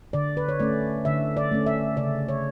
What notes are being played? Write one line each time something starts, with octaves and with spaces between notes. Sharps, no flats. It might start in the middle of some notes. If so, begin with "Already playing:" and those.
D3 D5
B4
C#5
A3 C#4 D5
D3 E5
D5
A3 C#4
E5
C#3 D5
C#5